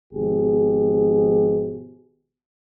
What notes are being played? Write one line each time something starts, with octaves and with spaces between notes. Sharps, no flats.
G#1 B2 F3 G4 G#4